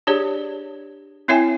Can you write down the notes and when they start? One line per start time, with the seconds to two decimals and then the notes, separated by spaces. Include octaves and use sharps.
0.07 D4 G4 G#4 C#5 D5
1.28 C4 E4 C#5 E5 G5 G#5